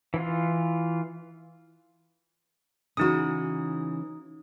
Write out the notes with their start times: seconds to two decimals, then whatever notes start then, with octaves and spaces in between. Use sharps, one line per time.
0.14 E3 F4
2.97 C#3 E3 D#4 F#4 D#6